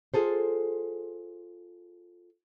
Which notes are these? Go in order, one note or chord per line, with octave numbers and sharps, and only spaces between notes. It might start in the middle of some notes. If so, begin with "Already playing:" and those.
F4 G#4 A4 C5